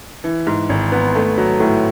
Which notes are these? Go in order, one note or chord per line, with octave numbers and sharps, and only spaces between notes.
E3
G#2
G#1
B3
A3
F#3
A2